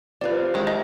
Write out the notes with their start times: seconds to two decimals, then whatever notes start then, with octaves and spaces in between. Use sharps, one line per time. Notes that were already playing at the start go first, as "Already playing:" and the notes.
0.21 C3 F4 B4 D5
0.54 D#3 G#3 E4
0.67 A3 D#5 A#5